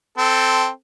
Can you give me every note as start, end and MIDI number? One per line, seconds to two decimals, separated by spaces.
0.18 0.68 60
0.18 0.68 69